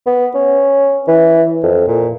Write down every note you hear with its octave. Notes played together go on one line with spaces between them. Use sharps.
B3
C#4
E3
F2
A#2